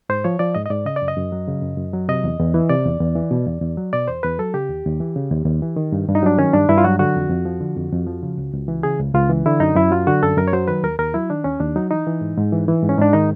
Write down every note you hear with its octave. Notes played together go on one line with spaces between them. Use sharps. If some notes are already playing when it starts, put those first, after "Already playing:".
G#2 C5
F3 C#5
F3 D5
G#2 D#5
D#5
G#2 D5
C#3 D#5
D5
F#2
D#5
F#2
F#3
C#3
F#2
F#2
F#3
C3 D#5
E2
E2
E3
C3 D5
E2
E2
E3
B2
E2
E2
F#3
B2 D5
E2 C5
E2 B4
F#3 A4
C#3 G4
D#2
D#2
E3
C#3
D#2
D#2
E3
D#3
G2
G2
D#4
F#3 D4
D#3 C#4
G2 D4
G2 E4
F4
F#3 F#4
D3 F#4
F2
F2
F3
D3
F2
F2
F3
C#3
C#2
C#2
E3
C#3 G#4
C#2
C#2 F4
E3
D3 E4
F#2 D#4
F#2 E4
F#3 F4
D3 F#4
F#2 A4
F#2 A#4
C#5
F#3 C5
D#3 B4
D#2 A#4
D#2 A#4
F#3 E4
D#3 D4
D#2 C#4
D#2 D4
F#3 D#4
E3 D#4
E3
G#2
G#2
E3
E3
G#2
C#4
G#2 D4
D#3 D#4